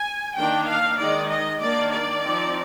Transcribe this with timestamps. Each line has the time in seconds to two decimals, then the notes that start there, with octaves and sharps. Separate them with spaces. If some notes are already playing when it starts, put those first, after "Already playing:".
Already playing: G#5
0.36 D#3 A#3 D4 G5
0.67 F5
0.98 D#3 G#3 D#4 D5
1.30 D#5
1.61 D#3 A#3 D4 D5
1.92 D5
2.23 F3 C4 D#4